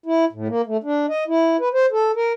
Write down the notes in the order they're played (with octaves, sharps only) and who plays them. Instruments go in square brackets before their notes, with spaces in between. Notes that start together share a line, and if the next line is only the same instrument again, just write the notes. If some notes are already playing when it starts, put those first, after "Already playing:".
[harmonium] E4
A2
A#3
A3
D4
D#5
E4
B4
C5
A4
A#4